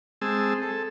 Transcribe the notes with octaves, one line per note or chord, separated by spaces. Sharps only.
G#3 C4 G#4 A5 E6
A4